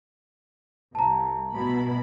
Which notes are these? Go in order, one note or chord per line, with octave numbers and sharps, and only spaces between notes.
C2 A5 A#5
B2 E4 B5